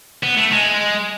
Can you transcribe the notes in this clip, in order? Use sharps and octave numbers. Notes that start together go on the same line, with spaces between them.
B3
A3
G#3